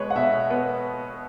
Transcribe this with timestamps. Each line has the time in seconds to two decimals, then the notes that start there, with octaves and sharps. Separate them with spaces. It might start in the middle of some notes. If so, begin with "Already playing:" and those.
Already playing: B2 G#3 B4 C#5
0.10 F#5
0.15 B2 E5
0.50 B3